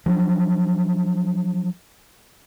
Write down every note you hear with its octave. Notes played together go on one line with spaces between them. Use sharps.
F3 F#3 D4